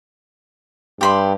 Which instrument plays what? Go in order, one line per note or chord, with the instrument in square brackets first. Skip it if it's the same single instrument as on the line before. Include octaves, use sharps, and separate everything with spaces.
[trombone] G2 [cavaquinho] G4 B5 C6